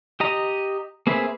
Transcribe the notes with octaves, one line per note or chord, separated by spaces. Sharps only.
G4 D#5 A#5
A#3 C4 G#4 B4 E5